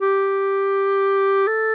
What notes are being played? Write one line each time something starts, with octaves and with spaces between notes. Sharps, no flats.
G4
A4